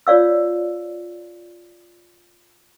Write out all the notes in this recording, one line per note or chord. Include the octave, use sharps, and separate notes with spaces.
F4 C#5 D5 F5 E6